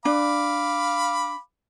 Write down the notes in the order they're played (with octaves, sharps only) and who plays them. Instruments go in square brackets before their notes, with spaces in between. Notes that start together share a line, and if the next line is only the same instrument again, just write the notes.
[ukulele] D4 [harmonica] F5 B5 D6